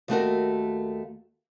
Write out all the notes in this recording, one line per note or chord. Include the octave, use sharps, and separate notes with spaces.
D#2 A3 F#4 A#4